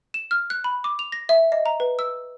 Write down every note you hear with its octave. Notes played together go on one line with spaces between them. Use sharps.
E7
F6
F#6
B5
D6
F7
A#6
E5
D#5
A#5
B4
E6